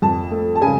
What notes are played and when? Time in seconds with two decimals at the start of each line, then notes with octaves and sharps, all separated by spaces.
0.02 F2 A5
0.31 A3
0.55 A5
0.61 C#3 G#5